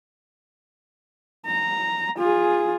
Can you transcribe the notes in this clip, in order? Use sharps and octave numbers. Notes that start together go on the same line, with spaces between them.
A#5
F4 G#4